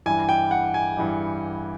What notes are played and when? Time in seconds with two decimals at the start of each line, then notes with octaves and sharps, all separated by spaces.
0.06 G2 E3 G3 G#5
0.29 G5
0.51 F#5
0.74 G#5
0.97 G2 E3 G3